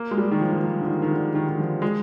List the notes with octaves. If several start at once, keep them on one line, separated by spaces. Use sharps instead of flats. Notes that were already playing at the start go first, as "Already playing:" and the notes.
Already playing: A#3
G#3
G3
D#3
F3
D#3
F3
D3
D#3
D#3
D3
D#3
D#3
F3
G#3